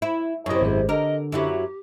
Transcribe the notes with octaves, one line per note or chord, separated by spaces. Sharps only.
E4
F#2 C3 E4 C#5 D#5
G#1 G#3
D3 A#4 D#5
F#2 F#3 E4 G4